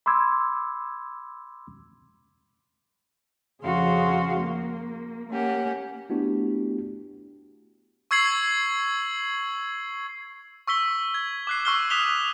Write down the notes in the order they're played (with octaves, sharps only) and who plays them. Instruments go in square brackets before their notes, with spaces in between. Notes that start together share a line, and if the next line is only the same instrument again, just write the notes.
[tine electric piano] B5 C6 D6 E6 G#6
[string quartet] F2 C#3 F#4 G#4 F5 C6
A#3
A#3 C#4 G4 F#5
[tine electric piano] A3 B3 D4 E4 F#4 G4
[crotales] C#6 E6 G#6 C7 F#7
C#6 E6 B6 G7
G#6
D6 F#6 C7
C#6 E6 F6 C7 G7
D#6 F#6 B6 E7 F7 G7